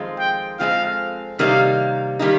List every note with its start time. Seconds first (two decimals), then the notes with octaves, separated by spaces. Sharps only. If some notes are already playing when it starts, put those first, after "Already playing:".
Already playing: F2 D#3 G#3 C4 F4
0.19 G5
0.59 F2 D#3 G#3 C4 F4 F5
1.39 C3 D#3 G3 A#3 D#4 F5
2.19 D#3 G3 A#3 D#4